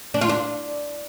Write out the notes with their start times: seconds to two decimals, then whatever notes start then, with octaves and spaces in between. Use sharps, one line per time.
0.14 D4
0.21 F4
0.29 D4